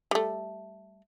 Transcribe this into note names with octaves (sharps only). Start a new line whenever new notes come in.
G3 A3